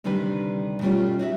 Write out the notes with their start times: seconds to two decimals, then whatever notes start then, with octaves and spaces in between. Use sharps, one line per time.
0.04 D2 C3 D#3 G3 D4 B4
0.81 B2 G3 A3 C#4 F4
1.19 D#4 F#4 D5 E5